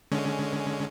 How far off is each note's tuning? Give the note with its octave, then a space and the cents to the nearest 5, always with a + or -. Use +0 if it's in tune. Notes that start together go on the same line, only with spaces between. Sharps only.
D3 +0 G#3 +5 C#4 +10